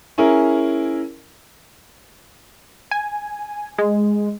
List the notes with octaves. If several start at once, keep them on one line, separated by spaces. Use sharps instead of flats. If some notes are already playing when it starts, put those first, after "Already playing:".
C#4 E4 G#4 A#4
G#5
G#3